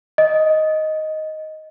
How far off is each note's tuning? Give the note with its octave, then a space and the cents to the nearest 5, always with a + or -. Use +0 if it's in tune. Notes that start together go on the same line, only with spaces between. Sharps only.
D#5 +5